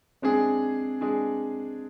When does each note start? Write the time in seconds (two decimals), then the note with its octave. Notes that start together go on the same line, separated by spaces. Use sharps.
0.22 G#3 C4 D4 G#4
1.01 G#3 D4 G#4